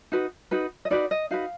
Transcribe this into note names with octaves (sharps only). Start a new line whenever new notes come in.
D#4 F#4 B4
D#4 F#4 B4
D#5
D#4 F#4 B4 D5
D#5
D#4 F#4 B4 F5